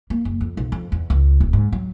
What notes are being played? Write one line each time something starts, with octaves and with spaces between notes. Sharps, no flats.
A#3
F#1
F2
B1
F2
E2
C#2
D#1
G#2
F#3